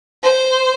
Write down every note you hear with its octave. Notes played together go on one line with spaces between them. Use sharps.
C5